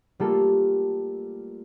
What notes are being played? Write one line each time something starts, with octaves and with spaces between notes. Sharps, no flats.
G3 A3 A#3 F4 A4